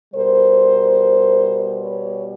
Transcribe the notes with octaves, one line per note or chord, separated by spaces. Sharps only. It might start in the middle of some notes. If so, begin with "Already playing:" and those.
B2 G3 A#4 C5
B4 C#5